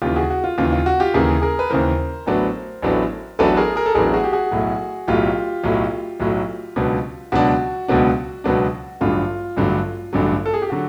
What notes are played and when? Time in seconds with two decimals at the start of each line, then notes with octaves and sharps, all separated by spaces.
0.02 D#2 C#3 E3 F4 G4
0.16 F#4 G#4
0.30 F#4
0.44 F4
0.58 D#2 C#3 E3 F4
0.73 F4
0.86 F#4
1.00 F4 G4
1.14 D#2 C#3 E3 G#4 A#4
1.42 G#4 A#4
1.59 B4
1.70 D#2 C#3 E3 A#4 C5
2.26 A1 A2 F#3 B3 D4
2.82 A1 A2 F#3 B3 D4
3.39 A1 A2 F#3 B3 D4 A4 B4
3.57 G#4 A#4
3.76 G#4 A#4
3.86 A4
3.95 A1 A2 F#3 B3 D4 G#4 A#4
4.13 F#4 G#4
4.24 G4
4.33 F#4 G#4
4.51 B1 A2 F#3
5.08 B1 A2 F#3 F4 G4
5.64 B1 A2 F#3
6.20 B1 A2 F#3
6.76 C#2 B2 F#3 B3 D4
7.32 C#2 B2 F#3 B3 D4 F#4
7.88 C#2 B2 F#3 B3 D4
8.44 C#2 B2 F#3 B3 D4
9.01 A1 G2 D3 F#3 F4
9.56 A1 G2 D3 F#3
10.13 A1 G2 D3 F#3
10.46 A4
10.54 G#4
10.62 G4
10.70 D3 F#3 F#4